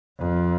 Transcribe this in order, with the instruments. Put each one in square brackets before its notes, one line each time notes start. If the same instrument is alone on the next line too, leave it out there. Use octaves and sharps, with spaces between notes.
[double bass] F2